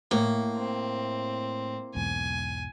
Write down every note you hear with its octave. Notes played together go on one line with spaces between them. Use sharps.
A2 A#3
C4
B1 E2 G#2 G#5